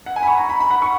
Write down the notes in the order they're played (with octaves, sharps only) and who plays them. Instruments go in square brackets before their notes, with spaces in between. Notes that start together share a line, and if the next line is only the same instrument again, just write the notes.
[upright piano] F#5
G#5
B5
C#6
A#5
B5
B5
F#5
C#6